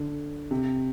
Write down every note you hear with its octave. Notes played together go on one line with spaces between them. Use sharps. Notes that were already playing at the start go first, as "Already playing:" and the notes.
Already playing: D3
C3